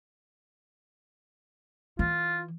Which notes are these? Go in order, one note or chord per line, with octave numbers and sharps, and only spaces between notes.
E3 F4